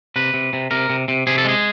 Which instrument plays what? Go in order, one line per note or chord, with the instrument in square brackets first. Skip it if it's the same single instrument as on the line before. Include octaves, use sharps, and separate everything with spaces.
[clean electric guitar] C3 B4
C3
C3
C3 A#4
C3
C3
C3 G#4
A4
G#3 G#4